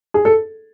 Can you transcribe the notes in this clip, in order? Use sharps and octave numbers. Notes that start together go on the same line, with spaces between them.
G#4
A4